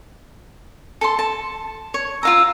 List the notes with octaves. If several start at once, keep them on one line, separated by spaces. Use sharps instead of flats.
A4 A5 C6
A5
C#5
F4 F5 A#5 E6